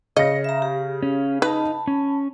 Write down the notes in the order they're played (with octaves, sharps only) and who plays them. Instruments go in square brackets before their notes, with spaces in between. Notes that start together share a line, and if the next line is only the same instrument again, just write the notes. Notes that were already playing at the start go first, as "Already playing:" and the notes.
[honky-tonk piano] C#3 A#6 [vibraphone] C#5 [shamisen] D#5
[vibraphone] E5 A#5
G4
[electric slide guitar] C#4
[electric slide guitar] D#4 [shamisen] B4 [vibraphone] A5 B5
[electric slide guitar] C#4